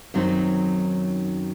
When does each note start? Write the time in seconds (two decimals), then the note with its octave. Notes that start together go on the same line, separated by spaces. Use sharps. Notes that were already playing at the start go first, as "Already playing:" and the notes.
0.14 F#2 D#3 F#3 C4 D#4